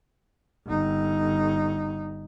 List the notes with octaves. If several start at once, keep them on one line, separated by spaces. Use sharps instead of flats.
G1 D#4